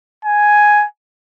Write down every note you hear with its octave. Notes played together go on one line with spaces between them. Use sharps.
G#5